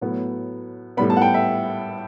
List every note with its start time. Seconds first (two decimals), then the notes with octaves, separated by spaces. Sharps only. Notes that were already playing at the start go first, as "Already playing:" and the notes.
0.01 A2 F#3 B3
0.97 A2 G3 B3 B5
1.10 A5
1.17 F#5
1.22 G5
1.34 E5